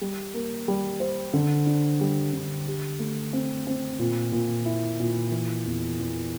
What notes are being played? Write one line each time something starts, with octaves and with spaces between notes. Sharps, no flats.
G3
A#3
G3
C5
D3
D4
G3
D3
G4
A3
C4
C4
A#2
A#2
E4
A#2
E3
E2
E2